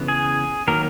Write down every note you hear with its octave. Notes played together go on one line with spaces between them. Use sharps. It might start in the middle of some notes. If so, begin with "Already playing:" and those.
Already playing: C#3 E3 B3
G#4
D#3 F#3 A#3 A#4